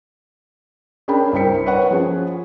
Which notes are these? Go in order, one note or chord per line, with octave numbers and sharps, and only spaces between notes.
C#4 D4 G#4 A#4 G5 B5
C2 A#4 C5 G5 B6 C#7
B4 C#5 F#5
F3 C#4 G#4